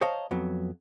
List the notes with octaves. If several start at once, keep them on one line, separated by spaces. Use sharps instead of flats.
C5 C#5 D#5 F5 A5 A#5
F2 F#3 B3